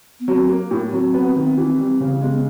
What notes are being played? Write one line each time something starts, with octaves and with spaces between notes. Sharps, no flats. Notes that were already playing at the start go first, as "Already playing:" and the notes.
B3
F#3 C4
A#3
A2
F#3 C4
B3
D#3
E3
G3
C#3
G#3 B3
C#4